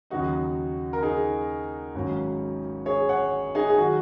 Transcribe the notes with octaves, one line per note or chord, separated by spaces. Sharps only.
D#2 C#3 F#3 D#4 F#4
A#4
D#4 G#4
G#1 G#2 F#3 C#4
G#4 C#5
C#5 F#5
D#4 G#4
G#4
D#3 F#3 F#4